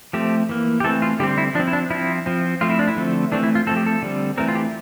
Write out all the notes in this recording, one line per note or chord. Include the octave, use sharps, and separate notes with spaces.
F3 A3 C4 G4
E3 A#3
G4
E3 A3 C4 A4
F4
D3 G3 C4 G4
E4
F3 C4 D4
E4
D4
F3 C4 E4
F3 C4
F3 A3 C4 F4
E4
D4
E4
D3 F3 A3 C4
E3 A3 C4 D4
E4
F4
F3 A3 C4 A4
G4
A4
D3 G3 C4
E3 A3 C4 A#4
F4
G4